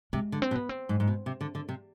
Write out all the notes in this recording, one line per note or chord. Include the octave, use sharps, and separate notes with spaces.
C3 G#3
D3
C4
B2
B3
C4
G#2
G#2
B2
C3
D3
D3
C3